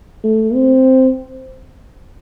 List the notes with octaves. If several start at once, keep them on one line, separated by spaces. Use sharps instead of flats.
A3
C4